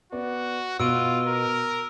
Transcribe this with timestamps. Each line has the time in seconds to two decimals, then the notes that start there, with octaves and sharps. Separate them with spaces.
0.12 B3 F#4 D5
0.80 B2 F4 F#4 E6 D7 D#7
1.27 A#4